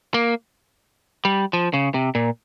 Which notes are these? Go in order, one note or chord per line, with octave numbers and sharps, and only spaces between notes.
A#3
G3
F3
C#3
C3
A#2